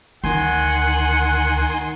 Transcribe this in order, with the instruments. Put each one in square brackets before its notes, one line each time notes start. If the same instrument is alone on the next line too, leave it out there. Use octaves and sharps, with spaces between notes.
[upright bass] D2 [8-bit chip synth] D#3 G#5 C6 [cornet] F#5